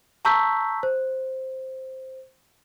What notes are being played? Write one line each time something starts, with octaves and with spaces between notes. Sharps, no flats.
A5 A#5 C#6 E6 G6 B6
C5